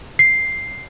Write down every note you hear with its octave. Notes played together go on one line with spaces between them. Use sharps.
C7